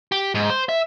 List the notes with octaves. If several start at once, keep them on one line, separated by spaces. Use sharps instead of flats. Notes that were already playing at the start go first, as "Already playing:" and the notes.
G4
G#2
C5
E5